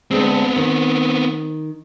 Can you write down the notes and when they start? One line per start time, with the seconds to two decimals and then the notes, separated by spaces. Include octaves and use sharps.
0.11 D2 G#3 B3 C4
0.56 D#3